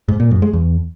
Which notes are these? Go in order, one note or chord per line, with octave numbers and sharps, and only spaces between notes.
G#2
A#2
F#2
G#3
E2